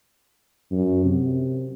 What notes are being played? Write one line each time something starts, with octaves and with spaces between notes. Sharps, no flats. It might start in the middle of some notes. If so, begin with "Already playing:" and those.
F#2
C3